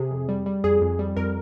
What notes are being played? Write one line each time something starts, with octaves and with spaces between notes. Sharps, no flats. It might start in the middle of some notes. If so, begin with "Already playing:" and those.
Already playing: C3 G#4
F2
G3
G3
F2 G#4
F2
G3
F2 A#4